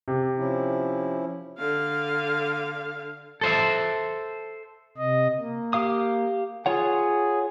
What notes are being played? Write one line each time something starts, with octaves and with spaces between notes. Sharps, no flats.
C3
F3 C#4 E4
D3 F5
A4 C5 E5
C3 D#5
A#3
G4 F5 D#6
F4 G#4 C#5 F#5